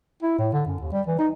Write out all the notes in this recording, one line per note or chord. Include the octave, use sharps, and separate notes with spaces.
E4
A2
D3
F#2
D#2
G3
E3
D#4